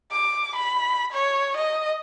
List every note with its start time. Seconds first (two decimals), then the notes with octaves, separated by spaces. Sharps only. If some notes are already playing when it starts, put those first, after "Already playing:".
0.11 D6
0.56 B5
1.13 C#5
1.57 D#5